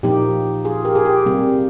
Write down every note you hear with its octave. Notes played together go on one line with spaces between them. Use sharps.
A#2 F3 A#3 D#4 G4
F4 G#4
G4 A#4
G#4
G4
C3 G3 A#3